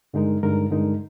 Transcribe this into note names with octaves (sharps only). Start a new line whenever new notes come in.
G2 D3 G#3 D#4 A#4
G2 D3 G#3 D#4 A#4
G2 D3 G#3 D#4 A#4